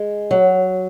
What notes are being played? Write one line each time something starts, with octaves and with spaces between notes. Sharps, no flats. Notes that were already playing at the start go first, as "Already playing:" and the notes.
Already playing: G#3
F#3